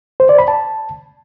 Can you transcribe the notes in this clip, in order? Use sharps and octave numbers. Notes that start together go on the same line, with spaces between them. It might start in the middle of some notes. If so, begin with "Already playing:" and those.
C5
D5
B5
A5